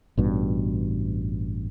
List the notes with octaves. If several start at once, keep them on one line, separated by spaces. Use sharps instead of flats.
A1 G2 B2